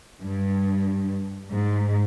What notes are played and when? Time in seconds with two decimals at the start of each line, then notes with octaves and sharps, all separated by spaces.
0.22 G2
1.53 G#2